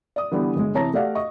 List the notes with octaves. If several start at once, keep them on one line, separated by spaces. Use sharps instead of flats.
D5 D#6
D3 E3 G3 B3 D4
G1 G#3
C3 E3 C#5 A5 A#5 A#6
A3 G4 D5 F5 F#5
D#5 C#6